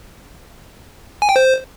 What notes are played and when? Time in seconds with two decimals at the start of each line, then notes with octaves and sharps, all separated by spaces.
1.22 G#5
1.29 G5
1.36 C5